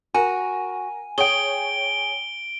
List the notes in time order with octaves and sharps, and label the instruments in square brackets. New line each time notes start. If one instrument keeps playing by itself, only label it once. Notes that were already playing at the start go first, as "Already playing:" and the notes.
[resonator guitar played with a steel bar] F#4 [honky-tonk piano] A#4 [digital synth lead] G#5
[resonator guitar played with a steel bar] G#4 [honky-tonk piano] C#5 G5 [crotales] D7 G7